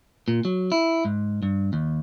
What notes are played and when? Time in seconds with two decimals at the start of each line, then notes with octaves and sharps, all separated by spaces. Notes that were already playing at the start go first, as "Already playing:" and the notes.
0.28 A#2
0.45 F#3
0.72 E4
1.05 G#2
1.43 G2
1.73 D#2